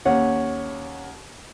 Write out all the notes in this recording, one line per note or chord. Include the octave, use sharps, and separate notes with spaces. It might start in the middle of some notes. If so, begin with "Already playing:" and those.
D#2 C#4 F#5